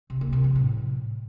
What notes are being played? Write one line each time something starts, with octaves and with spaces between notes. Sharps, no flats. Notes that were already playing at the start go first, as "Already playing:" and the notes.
C3
A#3
C3
F3
A2